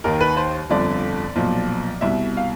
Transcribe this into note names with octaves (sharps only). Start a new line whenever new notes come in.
D#2 D#3 A#4
B4
C5
G1 F2 D3 F3 D5
B1 A#2 F3
C2 B2 E5
F5